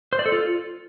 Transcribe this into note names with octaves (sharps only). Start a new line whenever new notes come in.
C5
D5
A4
F4